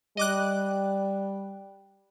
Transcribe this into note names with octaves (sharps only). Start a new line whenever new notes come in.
G3 D#5 D6 F#6